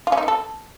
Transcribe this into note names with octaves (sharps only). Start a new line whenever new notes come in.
F4
C#4
D#4
B3
A4